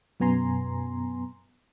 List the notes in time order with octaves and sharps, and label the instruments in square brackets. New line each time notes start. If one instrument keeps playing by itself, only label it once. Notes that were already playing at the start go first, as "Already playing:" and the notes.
[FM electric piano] F#2 B2 B3 G#5 A#5 C6